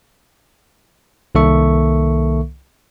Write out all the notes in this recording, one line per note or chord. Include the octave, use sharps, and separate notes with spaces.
C2 D#3 A#3 A4 E5 C#6